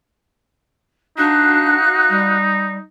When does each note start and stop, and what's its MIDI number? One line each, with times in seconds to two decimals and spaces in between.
1.18 1.76 62
1.18 2.86 63
1.18 2.36 66
1.18 2.36 77
1.18 2.36 90
2.09 2.77 55